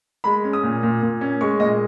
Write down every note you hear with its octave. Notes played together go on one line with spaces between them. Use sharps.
G#3 B5
C#4
D#6
A#2
A#2
A#2
C#4
G#3 C#6
A#2 D#5